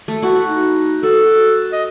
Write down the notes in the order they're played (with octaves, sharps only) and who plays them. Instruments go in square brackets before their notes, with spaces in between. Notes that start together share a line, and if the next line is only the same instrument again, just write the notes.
[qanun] A3
E4 F#4
[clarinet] D#4
[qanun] F#4 [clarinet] A4
[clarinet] D#5